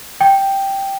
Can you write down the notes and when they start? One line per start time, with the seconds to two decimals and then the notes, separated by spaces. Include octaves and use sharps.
0.21 G5